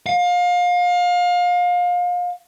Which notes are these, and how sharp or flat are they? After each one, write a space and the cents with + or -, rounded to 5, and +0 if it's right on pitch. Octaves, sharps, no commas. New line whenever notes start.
F5 +30